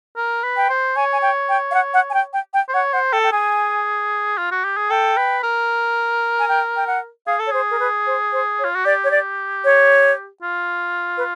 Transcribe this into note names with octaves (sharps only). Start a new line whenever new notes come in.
A#4
B4
G5
C5
C#5 G#5
G#5
G5
G5
F5
F#5
F#5
G#5
G5
G5
G5
C5
C#5 F#5
C5 F#5
A4 G5
G5
G#4 G#5
F4
F#4
G4
G#4
A4 G5
B4
A#4
G#5
G5
G5
F#5
G#4 F5
A4
C#5
G#4 C5
A#4
B4
C5
C5
C#5
F4
F#4
G4 D5
C#5
D5
C#5
F4
B4